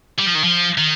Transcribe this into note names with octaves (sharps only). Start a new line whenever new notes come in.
G3
F3
D#3
F3
D#3